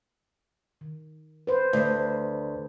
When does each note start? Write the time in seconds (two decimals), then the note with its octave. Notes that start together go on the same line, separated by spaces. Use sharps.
0.81 D#3
1.47 B4 C5
1.73 D2